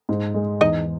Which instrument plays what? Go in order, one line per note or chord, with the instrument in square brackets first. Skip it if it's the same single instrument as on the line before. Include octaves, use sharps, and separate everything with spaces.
[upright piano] G#2
G#3
[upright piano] E2 [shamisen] D#4 D#5